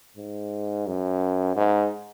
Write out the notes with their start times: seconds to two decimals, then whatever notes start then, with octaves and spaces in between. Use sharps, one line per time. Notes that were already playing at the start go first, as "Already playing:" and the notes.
0.17 G#2
0.87 F#2
1.56 G#2